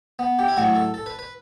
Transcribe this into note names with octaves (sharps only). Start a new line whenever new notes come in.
B3
G4
E4
A2 F#3 A3 F#4
A4
A4
B4
B4